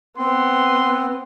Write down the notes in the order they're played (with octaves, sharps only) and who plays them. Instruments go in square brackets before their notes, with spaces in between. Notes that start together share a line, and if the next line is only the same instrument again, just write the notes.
[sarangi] B3 [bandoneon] C4 [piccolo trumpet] C6